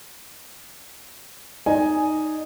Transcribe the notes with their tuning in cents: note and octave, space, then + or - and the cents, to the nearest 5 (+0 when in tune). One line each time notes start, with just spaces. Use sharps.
D#4 +0 D5 +0 G#5 +5